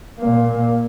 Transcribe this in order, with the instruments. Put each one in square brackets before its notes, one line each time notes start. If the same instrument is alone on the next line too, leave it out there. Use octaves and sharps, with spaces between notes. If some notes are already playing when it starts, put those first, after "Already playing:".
[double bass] A#2 A#3